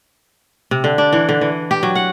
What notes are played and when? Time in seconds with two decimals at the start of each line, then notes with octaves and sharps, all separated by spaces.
0.71 C3
0.84 D3
0.98 D4
1.13 E3
1.29 D3
1.41 E3
1.71 G4
1.83 F#3
1.95 F#5